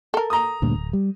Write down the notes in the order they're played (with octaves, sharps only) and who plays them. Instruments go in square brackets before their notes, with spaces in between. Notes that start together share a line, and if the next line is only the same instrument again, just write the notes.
[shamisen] A4 A#4
[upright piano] A#5 D#6
[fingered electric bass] D2 G2 A#2
D1
G3